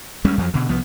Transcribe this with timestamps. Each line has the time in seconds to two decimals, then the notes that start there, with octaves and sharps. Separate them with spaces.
0.25 D2 G3 G#3 C#4
0.38 F2 F3 F#3
0.54 B2 D3
0.69 C2 F3 B3